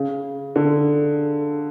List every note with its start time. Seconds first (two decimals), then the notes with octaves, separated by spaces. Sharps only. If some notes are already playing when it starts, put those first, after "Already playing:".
Already playing: C#3
0.56 D3